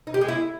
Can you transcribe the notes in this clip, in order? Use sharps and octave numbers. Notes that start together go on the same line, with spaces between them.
D#4
G4
G#3
E4